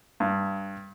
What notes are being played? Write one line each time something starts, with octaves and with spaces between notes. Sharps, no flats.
G2